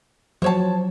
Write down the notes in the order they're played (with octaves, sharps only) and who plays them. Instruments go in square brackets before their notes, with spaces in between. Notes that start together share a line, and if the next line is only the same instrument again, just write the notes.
[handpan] F3 F#3 [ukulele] C5 C#5 A5